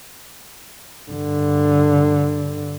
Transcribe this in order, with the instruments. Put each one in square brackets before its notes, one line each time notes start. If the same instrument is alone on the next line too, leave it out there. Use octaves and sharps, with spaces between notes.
[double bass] G2 D3